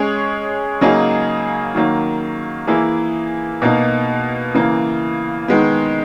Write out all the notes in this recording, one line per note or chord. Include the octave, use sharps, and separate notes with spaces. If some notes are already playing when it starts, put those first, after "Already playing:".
Already playing: G#3 C#4 G#4 C#5
C#3 F#3 A#3 D#4 G#4
D#3 F#3 A#3
E3 A#3 E4 G#4
B2 A#3 D#4
C#3 E3 A#3
D#3 G#3 B3